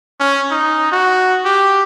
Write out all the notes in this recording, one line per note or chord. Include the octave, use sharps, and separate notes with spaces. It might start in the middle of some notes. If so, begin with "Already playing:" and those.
C#4
D#4
F#4
G4